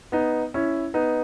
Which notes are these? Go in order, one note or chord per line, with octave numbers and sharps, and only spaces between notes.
B3 D#4
C#4 E4
B3 D#4